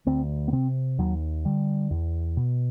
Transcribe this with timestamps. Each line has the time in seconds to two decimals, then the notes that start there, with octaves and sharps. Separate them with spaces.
0.06 D2 C4
0.48 B3
0.53 C3 C4
0.98 D#2 F#3
1.45 D3 G3
1.91 E2
2.37 B2